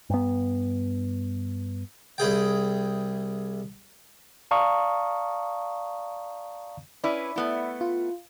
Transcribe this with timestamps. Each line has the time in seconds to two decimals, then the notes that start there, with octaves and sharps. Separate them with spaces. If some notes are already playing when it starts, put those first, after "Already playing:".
0.10 G2 B3
2.18 C2 E4 G#4 G5
4.51 D5 F5 A5 A#5 C#6 D#6
7.04 C#4 E4 B4 D5 E5 B5
7.36 A3 B3 E4
7.81 F4